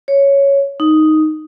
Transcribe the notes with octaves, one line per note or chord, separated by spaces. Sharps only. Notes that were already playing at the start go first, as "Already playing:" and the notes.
C#5
D#4